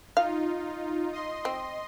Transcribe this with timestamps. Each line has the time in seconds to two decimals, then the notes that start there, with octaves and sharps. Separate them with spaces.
0.17 D#4 F4 F5
1.13 D#5 C6
1.45 C4